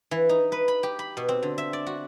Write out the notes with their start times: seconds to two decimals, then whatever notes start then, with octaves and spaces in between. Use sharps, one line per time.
0.11 E3
0.29 D#4
0.52 B4
0.68 B5
0.83 G4
0.99 B5
1.17 B2
1.29 C4
1.43 D3
1.58 E5
1.73 D5
1.86 F#4